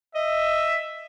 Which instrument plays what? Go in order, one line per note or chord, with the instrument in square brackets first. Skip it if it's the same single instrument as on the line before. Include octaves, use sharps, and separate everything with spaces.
[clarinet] D#5 [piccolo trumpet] E5